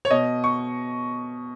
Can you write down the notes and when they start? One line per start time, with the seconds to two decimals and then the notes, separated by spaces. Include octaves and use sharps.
0.05 C#5
0.11 B2 D#5
0.44 C#6